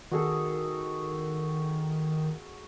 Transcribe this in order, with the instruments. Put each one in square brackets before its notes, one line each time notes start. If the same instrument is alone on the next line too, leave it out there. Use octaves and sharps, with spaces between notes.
[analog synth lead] D#3 [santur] F#4 G#4 A4